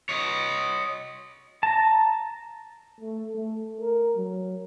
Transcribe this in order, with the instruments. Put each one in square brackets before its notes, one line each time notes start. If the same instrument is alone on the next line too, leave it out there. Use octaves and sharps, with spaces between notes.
[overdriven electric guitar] C#5 D#5
[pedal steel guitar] A5 A#5
[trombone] A3
A3
A#4
F#3